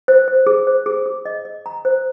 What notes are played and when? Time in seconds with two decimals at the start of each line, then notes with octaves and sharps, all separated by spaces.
0.08 C5
0.28 C5
0.47 G#4
0.67 C5
0.86 G#4
1.06 G#4
1.25 D#5
1.45 D#5
1.66 A#5
1.85 C5